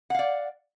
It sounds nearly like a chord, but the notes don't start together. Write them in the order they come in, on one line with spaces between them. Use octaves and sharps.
F#5 F5 D5